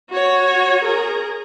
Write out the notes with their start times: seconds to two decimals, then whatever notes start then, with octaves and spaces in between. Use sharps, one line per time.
0.10 F#4 C#5
0.83 G#4 A#4